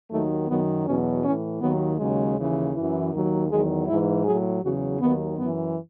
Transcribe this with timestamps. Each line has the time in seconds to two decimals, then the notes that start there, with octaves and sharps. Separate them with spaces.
0.10 D#2 D#3 F#3 A3
0.48 F#2 D#3 F#3 B3
0.86 E2 B2 F#3 C#4
1.23 A2 E3 C#4
1.61 D#2 D#3 F#3 B3
1.98 D#2 C#3 F#3 G#3
2.37 D#2 C#3 E3
2.74 F#2 E3
3.12 D#2 D#3 F#3
3.50 E2 D#3 F#3 G#3
3.87 G#2 E3 E4
4.25 A2 F#3 G#4
4.62 E2 C#3 F#3 F#4
5.00 D#2 D#3 F#3 B3
5.38 F#2 E3 B3